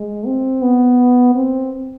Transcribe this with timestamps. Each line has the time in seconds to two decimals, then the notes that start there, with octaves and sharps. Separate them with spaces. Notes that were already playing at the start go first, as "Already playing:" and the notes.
Already playing: G#3
0.26 C4
0.62 B3
1.35 C4